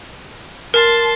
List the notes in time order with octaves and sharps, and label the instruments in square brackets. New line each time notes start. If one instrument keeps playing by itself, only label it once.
[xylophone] A#4 [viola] A5 C6